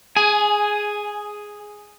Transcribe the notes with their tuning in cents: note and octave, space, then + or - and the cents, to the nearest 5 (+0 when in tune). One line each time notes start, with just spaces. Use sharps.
G#4 +0 G#5 +20